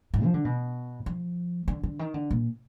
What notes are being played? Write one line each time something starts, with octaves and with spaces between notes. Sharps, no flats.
G#2
F3
D3
B2
F3
D3
D3
D#3
D3
A#2